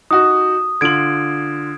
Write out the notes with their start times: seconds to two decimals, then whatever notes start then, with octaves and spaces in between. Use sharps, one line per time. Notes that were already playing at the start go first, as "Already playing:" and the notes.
0.11 D#4 F#4 D#6
0.81 D3 F4 G#6 D7 F#7